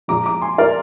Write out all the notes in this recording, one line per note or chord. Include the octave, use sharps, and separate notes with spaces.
A#2 F3 G#3 A#5 D6
A#5 D6
G#5 C6
A#4 D5